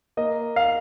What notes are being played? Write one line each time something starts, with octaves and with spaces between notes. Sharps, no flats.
A#3 D#5
F5